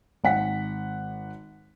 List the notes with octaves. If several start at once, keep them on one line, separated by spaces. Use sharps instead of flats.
G#1 F#5 B6